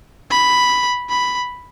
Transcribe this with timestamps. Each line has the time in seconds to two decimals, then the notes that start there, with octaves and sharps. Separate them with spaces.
0.31 B5
1.10 B5